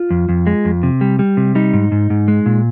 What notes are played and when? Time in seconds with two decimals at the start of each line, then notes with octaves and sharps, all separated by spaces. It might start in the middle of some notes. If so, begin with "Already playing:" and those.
Already playing: F4
0.10 F2
0.29 F2
0.47 G#3
0.65 F2
0.83 C3
1.01 G3
1.19 G3
1.37 C3
1.55 G3 D#4
1.73 G#2
1.92 G#2
2.10 G#2
2.28 G#3
2.46 A#2